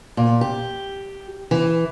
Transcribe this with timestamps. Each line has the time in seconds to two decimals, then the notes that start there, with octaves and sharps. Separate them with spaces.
0.17 A#2
0.41 G4
1.51 E3